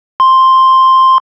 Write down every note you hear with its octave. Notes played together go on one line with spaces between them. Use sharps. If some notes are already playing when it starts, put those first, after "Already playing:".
C6